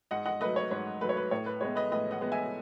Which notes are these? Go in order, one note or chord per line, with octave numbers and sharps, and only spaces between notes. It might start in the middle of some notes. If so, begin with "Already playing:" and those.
G#2 D#5 F#5
D#5 F#5
F#3 A3 B4 D#5
C#5
G#2 C#5
F#3 A3 B4
C#5
B4
A2 C#5
B4
G#3 B3 C#5
B4 D#5
A2 B4 D#5
D#5 F#5
G#3 B3
E5 G#5